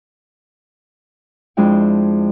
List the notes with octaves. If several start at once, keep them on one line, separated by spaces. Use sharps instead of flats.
F2 G#3 D4 E4 G5